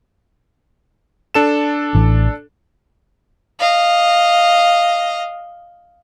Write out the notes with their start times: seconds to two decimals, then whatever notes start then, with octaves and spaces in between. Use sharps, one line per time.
1.34 D4 A4 E7
1.95 A1 E3
3.59 D#5 F5